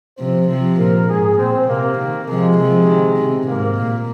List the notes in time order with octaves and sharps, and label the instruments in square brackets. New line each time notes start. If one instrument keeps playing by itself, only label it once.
[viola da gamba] C3 F3 [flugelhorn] C5
[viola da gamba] C3 F3
[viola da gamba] A#2 [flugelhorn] A#4
[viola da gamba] G#2 [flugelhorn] G#4
[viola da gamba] A#2 [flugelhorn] C4
[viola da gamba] C3 [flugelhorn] A#3
[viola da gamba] D#3
[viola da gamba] C3 F3 [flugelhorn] G#3
[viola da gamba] C3 F3
D#3
C3
[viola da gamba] G#2 [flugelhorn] A#3
[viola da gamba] A#2